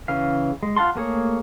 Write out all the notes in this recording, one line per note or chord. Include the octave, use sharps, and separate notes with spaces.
C#3 E3 F5
G#3
F4 F5 F#5 A5 C6
A3 A#3 G#4 C#5